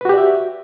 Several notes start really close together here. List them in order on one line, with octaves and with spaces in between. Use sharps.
B4 F#4 G4 D5 E5